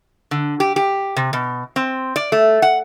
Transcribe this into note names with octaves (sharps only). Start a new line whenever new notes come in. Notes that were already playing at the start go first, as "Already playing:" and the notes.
D3
G4
G4
C3
B2
C4
D5
A3
F#5